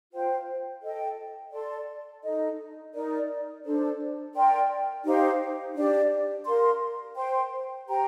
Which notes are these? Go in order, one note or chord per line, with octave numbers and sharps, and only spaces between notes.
F4 C5 G5
A4 D#5 G5
A4 D5 A5 C6
D#4 A4 D#5
D#4 A#4 D5
D4 A4 C5
A#4 D5 G5 C6
D#4 G4 C5 F5
D4 G4 D5
A#4 F5 C6
C5 G5 C6
G4 C5 G5 A#5